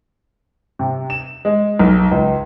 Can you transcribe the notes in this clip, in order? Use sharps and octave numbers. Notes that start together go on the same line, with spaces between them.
C3
E7
G#3
B1
C#2